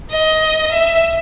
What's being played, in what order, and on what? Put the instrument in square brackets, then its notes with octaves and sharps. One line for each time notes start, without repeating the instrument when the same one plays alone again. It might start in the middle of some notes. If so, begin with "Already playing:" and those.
[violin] D#5
E5